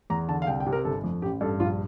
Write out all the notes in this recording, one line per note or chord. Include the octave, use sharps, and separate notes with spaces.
E2 A#5
D3 A5
F5
C2 G5
G5
C3
A#4
G1 A4
F2
A1 G4
G2 A4
A#1 F4